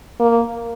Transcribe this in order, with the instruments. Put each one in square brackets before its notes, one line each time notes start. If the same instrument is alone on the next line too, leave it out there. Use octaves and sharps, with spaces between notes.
[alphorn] A#3